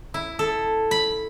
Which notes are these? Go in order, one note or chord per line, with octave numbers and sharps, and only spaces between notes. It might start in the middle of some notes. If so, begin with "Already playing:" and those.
E4
A4
B5